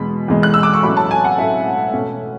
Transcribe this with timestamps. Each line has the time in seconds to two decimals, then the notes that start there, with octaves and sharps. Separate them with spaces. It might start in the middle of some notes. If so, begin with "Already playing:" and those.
Already playing: E2 B2 G#3 B5
0.28 E2 B2 G#3
0.43 F#6
0.54 E6
0.63 D6
0.74 C#6
0.83 A2 F#3 A3 C#4 B5
0.97 A5
1.11 G#5
1.25 F#5
1.38 A2 F#3 A3 C#4 E5
1.93 B2 A3 C#4